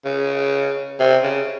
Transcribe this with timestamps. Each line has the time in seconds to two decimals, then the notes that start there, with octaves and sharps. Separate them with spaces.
0.05 C#3
1.00 C3
1.23 C#3